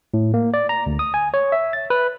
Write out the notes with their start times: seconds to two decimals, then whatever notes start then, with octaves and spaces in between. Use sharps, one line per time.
0.14 A2
0.34 A#3
0.54 D5
0.69 A#5
0.86 D2
0.99 D#6
1.14 G#5
1.34 C#5
1.52 E5
1.73 A6
1.90 B4